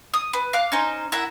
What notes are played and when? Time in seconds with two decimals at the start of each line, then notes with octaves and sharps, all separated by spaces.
0.14 D#6
0.33 B4
0.53 F5 D6 F#6
0.72 C#4 D#4 C5
1.12 E4 A#4 E5 F#5